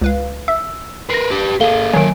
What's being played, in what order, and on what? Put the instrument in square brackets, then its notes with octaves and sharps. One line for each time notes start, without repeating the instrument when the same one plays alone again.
[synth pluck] C#2 B4 F5
[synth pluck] E5 [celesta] E6
[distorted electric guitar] A#4 B4 [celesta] A#6 C7
[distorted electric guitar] G4 B4
[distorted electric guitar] A#3 G#4 [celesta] A4 F5 G7
[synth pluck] D#3 F#3 [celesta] G#5 D7